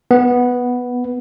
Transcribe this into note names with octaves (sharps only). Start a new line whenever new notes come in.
B3